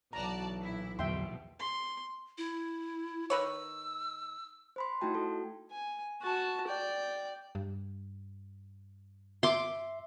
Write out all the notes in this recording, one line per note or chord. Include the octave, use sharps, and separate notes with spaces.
B1 E3 F#4 D5 A5 A#5
A#2 E4
A#1 E2 B2 D3 F#3 E5 G5 C6
C6
E4
D#3 B4 C#5 E6
C5 B5 C6
A3 D#4 E4 F#4 G5 A5
F#4 A4
G#5
F#4 A5
D5 G5
G2
E5 C6 D6